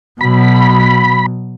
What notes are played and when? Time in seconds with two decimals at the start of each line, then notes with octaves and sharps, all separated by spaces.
0.21 B2 F#3 B5